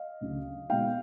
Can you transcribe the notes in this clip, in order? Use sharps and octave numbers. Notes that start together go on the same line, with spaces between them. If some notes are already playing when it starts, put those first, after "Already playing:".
Already playing: D#5 F5
D2 C#3 F#3
B2 G#3 B3 D#4 F5 G5